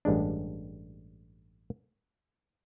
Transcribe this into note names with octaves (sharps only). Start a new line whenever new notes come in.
A1 G2 G#3 D4